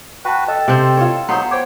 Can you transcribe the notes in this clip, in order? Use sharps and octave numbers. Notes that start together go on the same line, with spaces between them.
F#4 B4 G5 A5
A4 D#5 G5 A5
C3 C4
F4 C#5
F#3 B3 D#4 C5 C6
C5 C#5 G5 D6